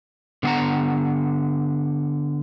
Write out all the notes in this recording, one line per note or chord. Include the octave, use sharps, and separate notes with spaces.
D3 B3 F5 F#5 A#5